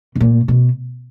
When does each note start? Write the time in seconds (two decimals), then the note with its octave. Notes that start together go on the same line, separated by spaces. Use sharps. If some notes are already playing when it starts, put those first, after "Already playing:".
0.15 B2
0.20 A#2
0.48 B2